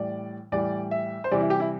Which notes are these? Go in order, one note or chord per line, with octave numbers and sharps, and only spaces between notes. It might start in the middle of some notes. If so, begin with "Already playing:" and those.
Already playing: A2 E3 G3 D5
A2 E3 G3 D5
E5
C5
C3 E3 G3 D5
E4
G4
E4